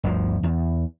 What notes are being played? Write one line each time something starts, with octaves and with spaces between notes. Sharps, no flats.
G1 D2 C3 F3
E2